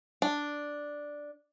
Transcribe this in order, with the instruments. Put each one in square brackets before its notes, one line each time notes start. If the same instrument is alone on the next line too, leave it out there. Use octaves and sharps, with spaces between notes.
[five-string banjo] D4